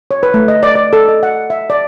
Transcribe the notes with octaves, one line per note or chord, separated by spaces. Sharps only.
C#5
B4
A3
D#5
D5
D5
A4
D#5
F#5
E5
D5